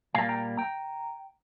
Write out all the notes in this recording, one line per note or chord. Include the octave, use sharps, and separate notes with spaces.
A#2 G3 A#3 F5 G#5
G5 A#5
G5 A#5